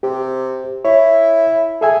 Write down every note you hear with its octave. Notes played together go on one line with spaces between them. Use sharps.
C3 G4
E4 C#5
G#4 A4 E5 G#5